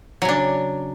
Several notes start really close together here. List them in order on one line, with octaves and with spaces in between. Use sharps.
F#3 C#3 D4